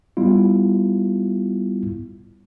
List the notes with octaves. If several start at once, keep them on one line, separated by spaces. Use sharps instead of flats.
G3 B3 E4 F4